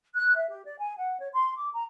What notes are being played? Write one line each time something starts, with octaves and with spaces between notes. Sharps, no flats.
F#6
E5
G4
D5
G#5
F#5
C#5
C6
D6
A#5